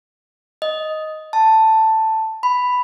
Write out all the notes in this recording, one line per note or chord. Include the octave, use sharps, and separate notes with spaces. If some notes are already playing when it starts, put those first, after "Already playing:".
D#5
A5
B5